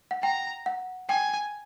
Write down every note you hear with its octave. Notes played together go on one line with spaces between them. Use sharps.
F#5
G5 A#5
F#5
G5 G#5